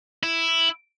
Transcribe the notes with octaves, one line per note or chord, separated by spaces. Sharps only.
E4